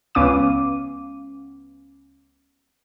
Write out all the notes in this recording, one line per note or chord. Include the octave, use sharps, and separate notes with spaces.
C#2 B3 C#4 F5 D6 D#7